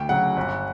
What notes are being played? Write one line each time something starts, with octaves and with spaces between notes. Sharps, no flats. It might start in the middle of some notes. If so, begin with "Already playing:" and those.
Already playing: D2 G5
C#3 F#3 F#5
G1